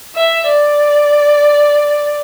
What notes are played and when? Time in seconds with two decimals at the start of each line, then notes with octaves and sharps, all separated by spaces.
0.15 E5
0.48 D5